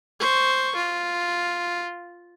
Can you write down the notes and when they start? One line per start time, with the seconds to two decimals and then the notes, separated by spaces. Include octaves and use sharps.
0.20 C5 C#6
0.76 F4